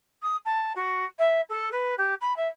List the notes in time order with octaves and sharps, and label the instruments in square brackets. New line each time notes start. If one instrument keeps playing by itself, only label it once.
[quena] D#6
A5
F#4
E5
A4
B4
G4
B5
E5